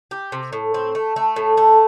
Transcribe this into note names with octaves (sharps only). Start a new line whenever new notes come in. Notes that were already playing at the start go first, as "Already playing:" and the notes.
G4
C3
A2
C4
A3
A3
A2
A3